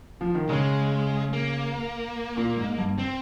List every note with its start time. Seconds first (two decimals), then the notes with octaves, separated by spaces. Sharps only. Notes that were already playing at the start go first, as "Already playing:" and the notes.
0.21 F3
0.35 D#3
0.49 C#3 G#3
1.33 A#3
2.37 A#2
2.57 G#2
2.78 G2
2.98 C4